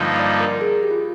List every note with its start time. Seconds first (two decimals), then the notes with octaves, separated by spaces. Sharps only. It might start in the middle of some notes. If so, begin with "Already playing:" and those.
Already playing: G2 D3 F3 A#3 D#4
0.19 D5
0.41 A#4
0.61 G#4
0.83 G4
0.91 F4